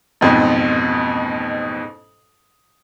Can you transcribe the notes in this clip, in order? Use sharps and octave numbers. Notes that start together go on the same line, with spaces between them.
A1 F2 G#2 B2